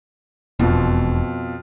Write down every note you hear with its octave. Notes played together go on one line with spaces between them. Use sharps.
E1 F2 B2 F4